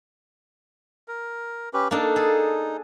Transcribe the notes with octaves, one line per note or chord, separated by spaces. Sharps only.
A#4
C#4 G4 B4
A#3 D4 D#4 A4
G#4 A4